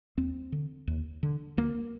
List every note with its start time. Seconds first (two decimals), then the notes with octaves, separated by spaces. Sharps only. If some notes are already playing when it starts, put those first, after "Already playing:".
0.17 D#2 C4
0.52 D3
0.87 D#2
1.23 D3
1.57 D2 A#3